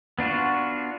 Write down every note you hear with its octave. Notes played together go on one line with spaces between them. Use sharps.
B3 D4 F4 F#4